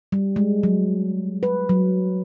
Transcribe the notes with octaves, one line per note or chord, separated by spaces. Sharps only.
G3
G#3
F#3
B4
F#3